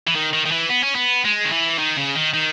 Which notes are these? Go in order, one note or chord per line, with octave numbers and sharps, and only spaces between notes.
E3
D#3
D#3
D#3
E3
B3
C#4
B3
G#3
D#3
E3
D#3
C#3
D#3
D#3